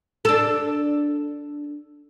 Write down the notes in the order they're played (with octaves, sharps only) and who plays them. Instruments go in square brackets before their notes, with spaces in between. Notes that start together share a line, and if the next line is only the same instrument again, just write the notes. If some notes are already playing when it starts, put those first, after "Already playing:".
[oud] D4 A4